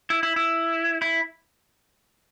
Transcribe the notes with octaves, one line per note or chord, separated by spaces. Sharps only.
E4
E4
E4
E4